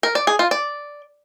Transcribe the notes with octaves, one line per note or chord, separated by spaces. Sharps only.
A#4
D5
G#4
F4
D5